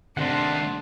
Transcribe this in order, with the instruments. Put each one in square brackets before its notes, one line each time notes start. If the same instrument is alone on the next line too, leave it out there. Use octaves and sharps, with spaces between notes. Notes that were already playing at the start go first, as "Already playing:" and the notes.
[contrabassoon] C3 [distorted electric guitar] D#3 A3 [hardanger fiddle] D4 [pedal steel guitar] F#5 C6